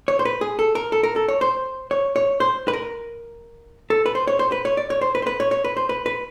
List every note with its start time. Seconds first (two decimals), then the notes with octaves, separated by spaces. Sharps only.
0.08 C#5
0.19 C5
0.25 B4
0.41 G#4
0.59 A4
0.75 A#4
0.92 A4
1.03 A#4
1.16 A4
1.28 C#5
1.41 C5
1.91 C#5
2.16 C#5
2.40 C5
2.68 B4
2.73 A#4
3.90 A4
4.06 B4
4.15 C5
4.27 C#5
4.39 C5
4.52 B4
4.65 C#5
4.77 D5
4.90 C#5
5.01 C5
5.15 B4
5.22 C5
5.27 B4
5.40 C#5
5.51 C#5
5.64 B4
5.77 C5
5.89 B4
6.06 B4